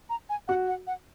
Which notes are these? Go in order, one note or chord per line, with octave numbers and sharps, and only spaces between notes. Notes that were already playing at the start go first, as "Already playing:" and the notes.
A#5
G#5
F#4 F#5
F#5
F#5